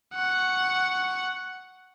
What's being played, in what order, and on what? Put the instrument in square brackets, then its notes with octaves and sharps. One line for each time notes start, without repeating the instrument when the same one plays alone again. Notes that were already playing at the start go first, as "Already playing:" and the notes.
[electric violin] F#5 C#6